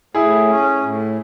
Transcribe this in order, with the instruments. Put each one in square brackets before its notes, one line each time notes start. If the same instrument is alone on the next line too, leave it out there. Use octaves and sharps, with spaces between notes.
[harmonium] A2 [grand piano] E4 G#4
[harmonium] C#4
A2